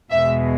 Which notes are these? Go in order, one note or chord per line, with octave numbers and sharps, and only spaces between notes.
E2 B2 G#3 E5